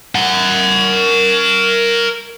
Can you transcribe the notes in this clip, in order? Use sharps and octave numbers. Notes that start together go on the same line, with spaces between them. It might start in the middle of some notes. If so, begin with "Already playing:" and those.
A#4 F#5